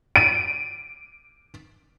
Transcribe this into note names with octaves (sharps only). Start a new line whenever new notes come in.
D7 D#7